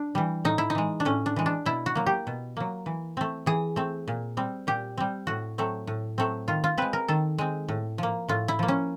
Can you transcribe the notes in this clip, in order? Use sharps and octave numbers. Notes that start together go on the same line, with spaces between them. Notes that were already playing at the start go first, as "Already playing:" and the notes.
Already playing: D4
E3 G3
A2 D#4
E4
D#4
E3 G#3
D4
A2 C#4
D4
E3 G#3
D4
B2 E4
F#4
F#3 A#3
G4
B2
F#3 A#3
E3
A3 C4
E3 G#4
A3 C4
A#2
G3 C4
A#2 G4
G3 C4
A2 F#4
F#3 A3 C4
A2
F#3 A3 C4
D#3 F4
F4
G#3 C4 B4
A#4
D#3 A4
G#3 C4
A2
F3 A#3
A2 F4
E4
F3 A#3
C#4